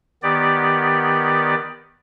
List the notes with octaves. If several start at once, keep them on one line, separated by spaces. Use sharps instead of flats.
D#3 B3 G4 D5